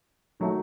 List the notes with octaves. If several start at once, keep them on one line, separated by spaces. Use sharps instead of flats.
D#3 F#3 A3